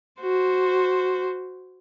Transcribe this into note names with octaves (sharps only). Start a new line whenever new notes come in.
F#4 C5